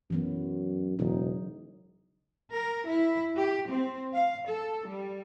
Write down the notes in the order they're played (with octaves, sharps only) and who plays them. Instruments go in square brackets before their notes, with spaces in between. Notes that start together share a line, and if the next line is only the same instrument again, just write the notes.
[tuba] F#2 [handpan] E3 F#3 B3
[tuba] E1 [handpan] C#3 F#3 D#4
[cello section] A#4
E4
G4
C4
F5
A4
G3